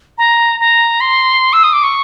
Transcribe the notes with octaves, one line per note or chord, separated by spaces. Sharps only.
A#5
A#5
C6
E6
D#6
D6
C#6